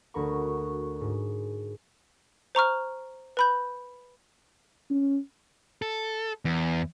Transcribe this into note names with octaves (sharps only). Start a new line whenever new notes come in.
D2 F#4 A#4 B5 C#6
G#2
C5 A#5 C#6 F6
B4 B5 G6
C#4
A4
E2